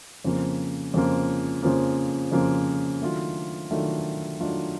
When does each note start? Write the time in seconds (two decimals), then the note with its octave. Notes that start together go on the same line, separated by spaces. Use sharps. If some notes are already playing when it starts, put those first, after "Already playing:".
0.24 F2 C#3 F3 A#3
0.94 F2 C#3 F3 A#3
1.63 F2 C#3 F3 A#3
2.32 F2 C#3 F3 A#3
3.01 D#3 F#3 A3 D4 F4
3.71 D#3 F#3 A3 D4 F4
4.40 D#3 F#3 A3 D4 F4